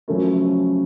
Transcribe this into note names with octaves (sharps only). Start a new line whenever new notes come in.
F#2 C#3 F3 A3 C#4